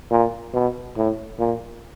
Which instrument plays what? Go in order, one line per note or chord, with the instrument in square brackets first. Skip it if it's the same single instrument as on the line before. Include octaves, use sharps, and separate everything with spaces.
[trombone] A#2
B2
A2
A#2